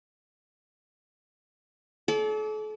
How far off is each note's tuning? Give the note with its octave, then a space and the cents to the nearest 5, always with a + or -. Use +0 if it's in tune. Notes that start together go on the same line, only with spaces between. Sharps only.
A4 -40 D5 -25